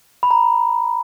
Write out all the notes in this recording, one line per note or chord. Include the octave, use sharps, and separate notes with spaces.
B5
A#5